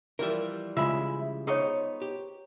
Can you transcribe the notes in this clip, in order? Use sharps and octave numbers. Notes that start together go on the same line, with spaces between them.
E3 F3 G3 A#4 E5
C#3 G#3 F4 E5 B5
B3 D#4 G#4 C5 C#5 D#5 C#6
G4